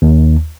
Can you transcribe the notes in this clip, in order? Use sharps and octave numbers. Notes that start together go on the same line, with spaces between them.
D#2